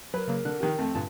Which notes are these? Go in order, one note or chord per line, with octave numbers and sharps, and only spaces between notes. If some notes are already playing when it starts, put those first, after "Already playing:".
F#3 A#4 B4
C#3 F#3 A#3
D3 F#6
C3 D#3
F2 A3 C4
G2 A#2 D3 A5